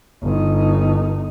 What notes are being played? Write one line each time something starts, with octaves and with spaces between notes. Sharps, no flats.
G1 D#4